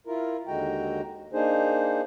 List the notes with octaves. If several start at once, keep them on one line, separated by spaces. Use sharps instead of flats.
E4 F4 A#4
D#2 D3 G#3 F#4 G5 A#5
A#3 D4 D#4 G#4 C5